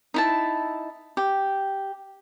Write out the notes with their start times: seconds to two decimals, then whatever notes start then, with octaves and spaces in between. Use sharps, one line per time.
0.14 D#4 E4 A5
1.17 G4